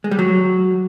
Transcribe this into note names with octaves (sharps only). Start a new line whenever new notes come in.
G#3
G3
F#3